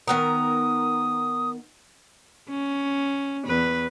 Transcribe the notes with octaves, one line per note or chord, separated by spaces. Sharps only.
D#3 B3 A#4 D#6
C#4
E2 B4